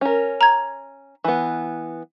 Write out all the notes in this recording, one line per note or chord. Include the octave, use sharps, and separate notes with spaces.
C#4 A#4
A#5 G#6
E3 B3